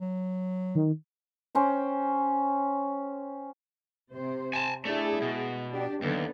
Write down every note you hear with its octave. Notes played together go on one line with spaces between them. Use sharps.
F#3
D#3
C#4 C5 G5
C3 C5
G#5 A5
A3 D4 E4 G#4
B2 G#3
D4 G4
D#2 D3 F#3 B3